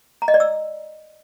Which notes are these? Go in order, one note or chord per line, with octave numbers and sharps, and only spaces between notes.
A#5
D#5
D5
E6